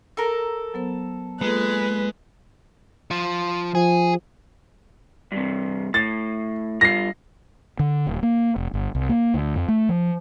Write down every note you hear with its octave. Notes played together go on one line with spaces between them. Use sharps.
A4 A#4
F#3 B3 C5
G#3 A#3 F4 A4 B4
F3
F3 G#4
G2 C3
A2 A6
G2 F4 A#6 C7
D3
D#1
A#3
F1
G1
C2
A#3
D2
F2
A3
F3